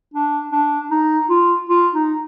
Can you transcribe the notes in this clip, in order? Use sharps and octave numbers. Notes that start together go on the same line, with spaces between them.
D4
D4
D#4
F4
F4
D#4